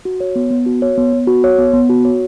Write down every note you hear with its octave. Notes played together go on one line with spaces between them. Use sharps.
F#4
C#5
B3
B3
F#4
C#5
B3
B3
F#4
C#5
B3
B3
F#4
C#5